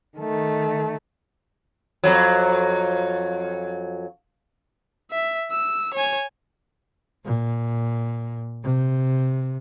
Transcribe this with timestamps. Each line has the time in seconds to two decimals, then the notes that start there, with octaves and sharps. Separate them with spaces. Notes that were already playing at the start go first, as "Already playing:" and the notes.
0.17 D#3 A3
2.04 F2 F#3
5.11 E5
5.51 E6
5.94 C#5 G#5
7.25 A#2
8.64 C3